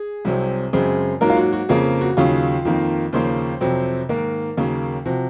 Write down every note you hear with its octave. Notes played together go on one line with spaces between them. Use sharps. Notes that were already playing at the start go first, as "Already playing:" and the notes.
Already playing: G#4
C2 C3 F#3 C4
F#2 C#3 G#3 C4
G#2 F#3 A#3 A#4
F4
F#4
F#4
F2 C#3 F3 A#3 G#4
F#4
D#2 C#3 F#3 F4
F2 D#3 A#3
D#2 C#3 F3 A#3 C5
F2 C3 F#3 C4
G#2 D#3 A#3 A#4
D#2 C#3 F#3 A#3
C3 F3 F#4